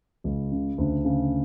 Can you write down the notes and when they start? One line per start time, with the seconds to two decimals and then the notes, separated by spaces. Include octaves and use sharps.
0.24 C#2
0.52 C#3
0.78 D2
1.05 C#3